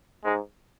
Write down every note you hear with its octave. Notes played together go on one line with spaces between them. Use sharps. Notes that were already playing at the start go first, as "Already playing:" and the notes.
G#2 G#3